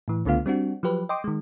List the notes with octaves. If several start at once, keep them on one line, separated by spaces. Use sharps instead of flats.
A2 E3
C#2 D3 A3 B3 F4 F5
G3 C4 D4 F#4
F3 F#3 G4 B4
D#5 G5 C6 D6 D#6
D#3 G#3